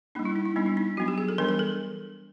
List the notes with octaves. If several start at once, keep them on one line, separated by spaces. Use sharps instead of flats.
G3 A#3 D4 D#4
E4
D#4
E4
G3 B3 D4 D#4
D4
D#4
F#3 B3 D4 F#4
G4
G#4
A4
E3 G3 B3 D4 A#4
A#4
A4